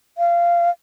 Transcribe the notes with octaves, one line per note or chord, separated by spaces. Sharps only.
F5